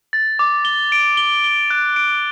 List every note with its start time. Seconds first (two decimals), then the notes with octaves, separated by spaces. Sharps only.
0.13 A6
0.39 D6
0.65 G7
0.92 D7
1.17 G7
1.44 G7
1.70 F#6
1.96 D7